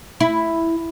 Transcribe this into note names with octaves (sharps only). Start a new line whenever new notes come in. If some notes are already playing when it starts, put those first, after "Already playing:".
E4